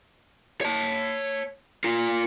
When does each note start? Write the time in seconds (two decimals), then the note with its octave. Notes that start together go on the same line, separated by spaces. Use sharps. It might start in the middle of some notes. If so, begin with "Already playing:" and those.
0.61 C#5 A5
1.84 F4 A#4